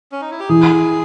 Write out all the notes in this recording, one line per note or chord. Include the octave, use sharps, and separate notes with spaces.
C#4
D#4
E4
G4
E3 G#4